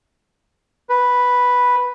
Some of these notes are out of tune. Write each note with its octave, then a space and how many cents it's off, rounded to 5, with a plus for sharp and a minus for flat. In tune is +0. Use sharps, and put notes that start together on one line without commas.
B4 +0